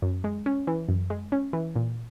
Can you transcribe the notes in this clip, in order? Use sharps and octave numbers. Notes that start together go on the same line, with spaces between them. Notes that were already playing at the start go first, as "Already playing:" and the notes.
F#2
G#3
C#4
E3
F#2
G#3
C#4
E3
A#2